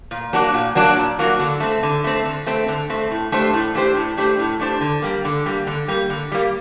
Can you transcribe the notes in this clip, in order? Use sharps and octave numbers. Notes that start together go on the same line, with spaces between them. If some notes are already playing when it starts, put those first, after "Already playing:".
A#2
F#3 A#3 D4 F#4
A#2
F#3 A#3 D4 F#4
A#2
F#3 A#3 D4 F#4
D3
A3 C4
D3
A3 C4
D3
A3 C4
D3
A3 C4
A2
A3 D4 G4 C5
A2
A3 D4 G4 C5
A2
A3 D4 G4 C5
A2
A3 D4 G4 C5
D3
G3 A#3
D3
G3 A#3
D3
G3 A#3
D3
G3 A#3